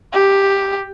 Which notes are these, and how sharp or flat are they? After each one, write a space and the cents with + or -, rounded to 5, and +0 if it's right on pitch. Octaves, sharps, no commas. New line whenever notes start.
G4 +5